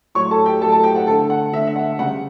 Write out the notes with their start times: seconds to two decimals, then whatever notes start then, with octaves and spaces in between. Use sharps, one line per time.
0.15 A2 F#3 A3 C#5 C#6
0.31 A4 A5
0.46 G4 G5
0.61 A2 F#3 A3 A4 A5
0.72 A4 A5
0.84 G4 G5
0.95 F#5
1.07 D3 A3 A4 A5
1.30 F#5
1.52 D3 A3 E5
1.67 E5
1.76 F#5
1.99 C#3 G3 F#5